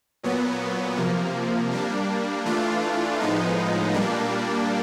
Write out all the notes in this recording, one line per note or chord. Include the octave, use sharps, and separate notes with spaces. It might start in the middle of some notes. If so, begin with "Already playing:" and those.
A#2 F#3 B3
C3 F3 A#3
G3 A#3 D4
E3 A3 D4 F4
A2 F3 G#3 B3 D#4
A#2 G3 A#3 D4